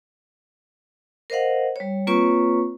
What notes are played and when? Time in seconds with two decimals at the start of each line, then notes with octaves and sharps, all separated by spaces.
1.30 A#4 C5 D#5 F5 F#5
1.76 G3 C#5
2.07 A#3 C4 F4 B4 C#5 C#6